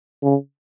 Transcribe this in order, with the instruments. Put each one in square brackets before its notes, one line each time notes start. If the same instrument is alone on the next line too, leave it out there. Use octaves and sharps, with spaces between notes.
[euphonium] C#3